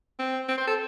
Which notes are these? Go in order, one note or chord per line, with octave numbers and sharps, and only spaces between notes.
C4
C4
C5
A4